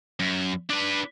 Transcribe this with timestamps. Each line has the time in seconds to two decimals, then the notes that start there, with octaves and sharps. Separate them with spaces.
0.20 F#2
0.70 D4 B4